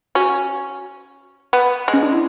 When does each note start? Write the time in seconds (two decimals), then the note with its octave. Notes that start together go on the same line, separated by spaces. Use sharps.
0.15 C#4 F#4
1.53 B3
1.88 G#3
1.94 C#4
2.03 D4
2.12 E4